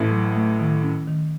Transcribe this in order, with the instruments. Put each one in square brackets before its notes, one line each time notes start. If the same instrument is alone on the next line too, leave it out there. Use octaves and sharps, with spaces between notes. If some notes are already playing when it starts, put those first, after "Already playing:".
Already playing: [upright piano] A1 A2
[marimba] F#3
A3
D#3
C#4
D#3